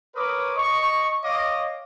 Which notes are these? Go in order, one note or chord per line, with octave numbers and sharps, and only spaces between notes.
A#4 B4 C#5 D6 D#6
D#5 C#6
C#5 D#5 F5 D6